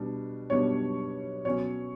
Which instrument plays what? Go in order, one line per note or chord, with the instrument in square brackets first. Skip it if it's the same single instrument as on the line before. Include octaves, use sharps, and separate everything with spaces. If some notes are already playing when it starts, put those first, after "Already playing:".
Already playing: [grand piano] B2 G3 D4
B2 G3 D4 C#5
B2 F#3 C#4 C#5